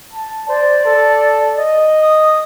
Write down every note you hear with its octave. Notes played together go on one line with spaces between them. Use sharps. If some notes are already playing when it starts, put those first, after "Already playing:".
A5
C5 D5
A4
D#5
D#6